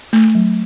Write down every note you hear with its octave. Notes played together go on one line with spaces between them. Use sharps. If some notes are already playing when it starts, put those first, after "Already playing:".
A3
F#3